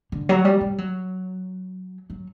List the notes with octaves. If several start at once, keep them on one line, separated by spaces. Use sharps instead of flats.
D3
F#3
G3
G3
F#3
F#3